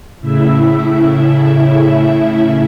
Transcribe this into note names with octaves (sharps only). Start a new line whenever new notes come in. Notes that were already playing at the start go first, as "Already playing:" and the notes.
A2 C#3 E4 E5